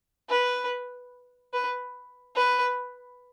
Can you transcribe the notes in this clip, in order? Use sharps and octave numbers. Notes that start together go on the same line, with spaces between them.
B4
B4
B4